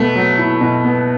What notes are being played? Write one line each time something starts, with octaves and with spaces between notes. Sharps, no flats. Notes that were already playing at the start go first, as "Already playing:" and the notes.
Already playing: B2 A3 B3
F#3
E4
B2
B3